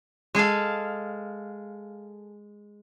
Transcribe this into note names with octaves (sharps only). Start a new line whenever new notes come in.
G#3 G#4 A4 F5